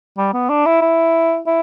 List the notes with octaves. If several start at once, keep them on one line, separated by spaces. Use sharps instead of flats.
G3
B3
D4
E4
E4
E4